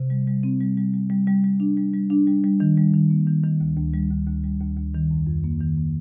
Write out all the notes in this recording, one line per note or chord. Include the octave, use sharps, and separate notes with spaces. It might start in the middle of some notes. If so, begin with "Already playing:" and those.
Already playing: C3
G3
G3
C4
G3
G3
G3
G3
G3
G3
D4
G3
G3
D4
G3
G3
D#3
G3
D#3
A#3
D#3
D#3
D2
D2
G3
D2
D2
G3
D2
D2
D#3
F2
F2
A#3
D#3
A#3